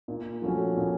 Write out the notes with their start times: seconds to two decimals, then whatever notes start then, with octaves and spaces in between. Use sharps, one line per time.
0.08 A#2
0.42 F3 A3 C#4 F#4
0.76 A#2